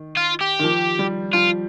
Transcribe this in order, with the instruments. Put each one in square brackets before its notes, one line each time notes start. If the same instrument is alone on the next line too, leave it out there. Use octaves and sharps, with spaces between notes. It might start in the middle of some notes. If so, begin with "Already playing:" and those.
Already playing: [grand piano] D#3
[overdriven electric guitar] F4
G4
[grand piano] D#3
F3
G3
[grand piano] F3 [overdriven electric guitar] F4